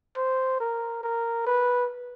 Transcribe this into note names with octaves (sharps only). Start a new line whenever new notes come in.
C5
A#4
A#4
B4